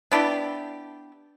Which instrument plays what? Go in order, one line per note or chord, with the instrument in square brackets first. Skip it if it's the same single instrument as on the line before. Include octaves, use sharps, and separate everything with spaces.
[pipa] B3 D4 E4 G4